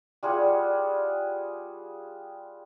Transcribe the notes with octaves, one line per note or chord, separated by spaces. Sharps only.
G3 F4 G#4 F#5